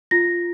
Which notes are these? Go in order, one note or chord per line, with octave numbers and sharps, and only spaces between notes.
F4 A#6